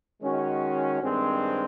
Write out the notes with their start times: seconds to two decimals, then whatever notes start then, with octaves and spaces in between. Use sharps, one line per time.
0.21 D#3 G#3 C#4 F#4
1.01 G2 D#3 G#3 C4